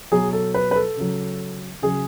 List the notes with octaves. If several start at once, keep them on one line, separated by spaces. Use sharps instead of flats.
B2 F#3 G#4
A4
B4
B4
A4
C#3 F#3
C#3 F#3 G#4